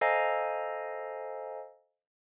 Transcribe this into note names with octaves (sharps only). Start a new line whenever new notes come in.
A4 C5 D#5 F5 G#5 A#5